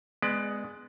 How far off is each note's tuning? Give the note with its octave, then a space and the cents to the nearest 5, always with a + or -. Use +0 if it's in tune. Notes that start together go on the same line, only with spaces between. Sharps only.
G#3 +0 B3 +10 D5 +25